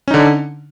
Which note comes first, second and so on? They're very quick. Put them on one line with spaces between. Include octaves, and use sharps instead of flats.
C#4 D#4 D3